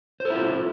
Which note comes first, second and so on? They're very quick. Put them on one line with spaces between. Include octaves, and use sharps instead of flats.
C5 A4 E4 F4